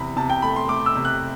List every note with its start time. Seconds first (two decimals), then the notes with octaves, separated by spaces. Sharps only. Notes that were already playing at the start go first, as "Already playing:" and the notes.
Already playing: E2 C3 B5
0.16 C3 A5
0.30 G5
0.42 A3 B5
0.56 C6
0.69 A3 D6
0.86 E6
0.96 C3
1.05 F#6